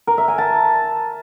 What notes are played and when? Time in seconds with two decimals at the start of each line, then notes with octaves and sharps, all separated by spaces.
0.07 A#4
0.18 E5
0.28 G#5
0.38 A5